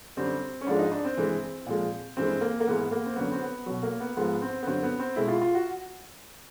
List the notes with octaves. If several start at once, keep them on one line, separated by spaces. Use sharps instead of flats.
F#2 D3 G3 C4
C#4
G#2 F3 G#3 D4
D#4
D4
C4
G2 E3 G#3
A#2 F3 G#3
G2 E3 G#3 C4
A#3
A#3
G#2 E3 G#3 B3
A#3
C4
F#2 D3 F#3 B3
C4
B3
B2 F#3
A#3
B3
G#2 F3 G#3 B3
C4
B3
G2 D3 F#3 C4
B3
C4
B2 G#3 E4
F4
F4
F#4